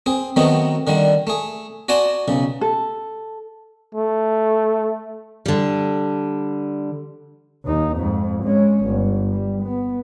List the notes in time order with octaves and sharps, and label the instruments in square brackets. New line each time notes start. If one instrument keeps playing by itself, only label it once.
[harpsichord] C4 G#4
D#3 F#3 A3 B3 C4 D#4
D3 D#3 G3
A3 G#4
F#4 D5 G#5 A5 C6
B1 C#3
[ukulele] A4
[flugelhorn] A3
[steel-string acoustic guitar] D3 G3
[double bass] D#2 D#4
F2 G#2
G#3 C#4
G1
G3
B3